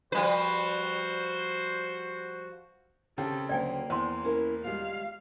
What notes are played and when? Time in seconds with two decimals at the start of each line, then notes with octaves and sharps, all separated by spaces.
0.12 F3 G3 F#4 B4 C5
3.18 C#3 C4 G4 A4 G5
3.49 D2 D3 F#3 A#3 D5 G5 G#5
3.90 E2 C5 G#5 C6
4.23 C#4 E4 A#4
4.64 G3 G#3 F4 F5